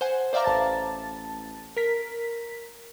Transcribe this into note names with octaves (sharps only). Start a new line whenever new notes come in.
C5 F#5 G#5
C5 D5 E5 F5 A#5 D6
A1 A5 A6
A#4 B6